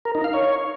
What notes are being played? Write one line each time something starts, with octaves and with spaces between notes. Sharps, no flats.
A#4
D#4
F5
C#5